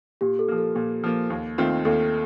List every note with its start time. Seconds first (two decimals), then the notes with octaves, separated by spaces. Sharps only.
0.21 A#2 G4
0.39 A4
0.48 F3 A#3
0.58 A4
0.76 A#2
1.04 F3 A#3
1.30 D#2
1.58 D#3 A3 C4 F4
1.85 D#2 A4